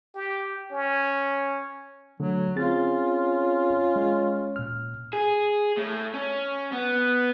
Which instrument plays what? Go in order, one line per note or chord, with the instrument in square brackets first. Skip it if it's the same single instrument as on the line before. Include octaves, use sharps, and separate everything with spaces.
[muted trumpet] G4
C#4
[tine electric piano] D3 A3 [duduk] F#3
[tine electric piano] C4 G#4 A6 [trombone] C#4 [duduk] F4
[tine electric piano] G#3
A#2 F6
[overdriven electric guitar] G#4
A2
C#4
B3